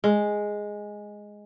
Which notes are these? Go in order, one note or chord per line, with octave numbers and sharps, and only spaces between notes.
G#3